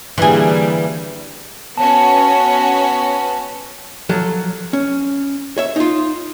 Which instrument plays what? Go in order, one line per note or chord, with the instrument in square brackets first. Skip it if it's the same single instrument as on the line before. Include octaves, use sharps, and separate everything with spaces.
[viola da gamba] D3 G3 A#3 [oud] E3 G#4
[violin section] B3 C#4 F#4 [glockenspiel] A5
[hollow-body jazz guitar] F3 F#3 A4
C#4
C#5 E5
D#4 F4